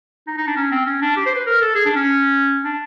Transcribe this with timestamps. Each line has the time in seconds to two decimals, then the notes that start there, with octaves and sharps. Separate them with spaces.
0.28 D#4
0.38 D#4
0.48 D4
0.57 C#4
0.72 C4
0.86 C#4
1.02 D4
1.17 G4
1.26 C5
1.36 B4
1.47 A#4
1.61 A4
1.75 G#4
1.85 D4
1.96 C#4
2.65 D4